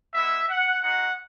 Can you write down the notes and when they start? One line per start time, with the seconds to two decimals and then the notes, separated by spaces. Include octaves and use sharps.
0.14 G#3 B3 E4 E5
0.49 F#5
0.83 G#3 D#4 F#4 F#5